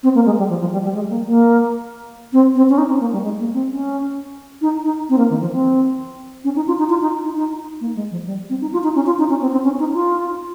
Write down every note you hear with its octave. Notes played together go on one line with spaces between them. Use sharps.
C4
A#3
G#3
G3
F3
F3
G3
G3
G#3
A#3
A#3
C4
C4
C#4
D#4
C4
A#3
G3
G#3
A#3
C4
C#4
D#4
D#4
C4
A#3
D#3
F3
C4
C#4
D#4
F4
D#4
F4
D#4
D#4
D#4
A#3
G#3
F3
G3
C4
D#4
F4
D#4
C#4
F4
D#4
C#4
C4
C4
C#4
D#4
F4